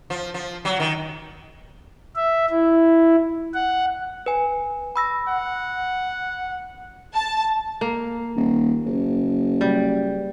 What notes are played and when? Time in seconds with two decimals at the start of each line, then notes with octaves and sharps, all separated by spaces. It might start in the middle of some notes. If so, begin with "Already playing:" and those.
0.10 F3
0.34 F3
0.65 F#3
0.80 D#3
2.15 E5
2.50 E4
3.54 F#5
4.26 B4 G#5
4.96 B5 E6 A#6
5.28 F#5
7.15 A5
7.81 A#3
8.36 D#1
8.86 F#1
9.61 G3